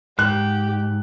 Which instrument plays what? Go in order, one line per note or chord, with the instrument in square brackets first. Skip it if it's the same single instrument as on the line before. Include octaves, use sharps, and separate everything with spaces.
[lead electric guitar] G#2 [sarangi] G4 [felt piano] F#6